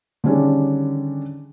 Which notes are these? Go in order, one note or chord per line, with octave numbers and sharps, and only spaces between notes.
D3 D#3 G3 C#4 D4 G#4